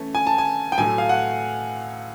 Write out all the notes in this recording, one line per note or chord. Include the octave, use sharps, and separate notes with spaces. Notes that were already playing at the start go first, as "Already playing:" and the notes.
Already playing: E3 A3 C#4
G#5
A5
G#5
G5
A2 F#3 A3 G#5
F5
F#5